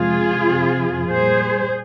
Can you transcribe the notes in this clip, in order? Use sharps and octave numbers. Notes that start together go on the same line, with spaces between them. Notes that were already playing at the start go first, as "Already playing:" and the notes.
Already playing: F2 C3 F3 G#3 F4 G#4
F2 C3 F3
A#2 G3 G#4 C5